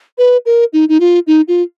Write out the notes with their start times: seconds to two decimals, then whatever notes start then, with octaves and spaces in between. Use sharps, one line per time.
0.18 B4
0.46 A#4
0.73 D#4
0.89 D#4
1.00 F4
1.27 D#4
1.48 F4